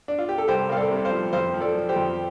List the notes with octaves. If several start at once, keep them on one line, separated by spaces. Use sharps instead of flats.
D4
F4
G4
A4
C2 G4 C5
C2 F5
A4 D5
C3
C5 F5
F3
F2 C5 F5
F3
A4 D5
F3
G4 C5
F2